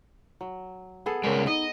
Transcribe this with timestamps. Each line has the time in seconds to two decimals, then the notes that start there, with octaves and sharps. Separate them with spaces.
0.41 F#3
1.06 B3 G#4 A4
1.24 C#3 G3 G#3 A#4
1.47 D#4 D#5